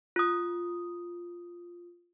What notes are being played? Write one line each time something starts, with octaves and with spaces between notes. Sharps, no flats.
F4 D#6